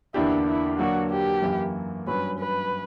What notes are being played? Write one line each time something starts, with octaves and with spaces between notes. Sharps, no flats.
E2 D3 A#3 D4 E4 G4
E4
D3 F#3 A#3 D4 F#4
G4
F#2 E3 A#3
G2 F#3 C#4 B4
B4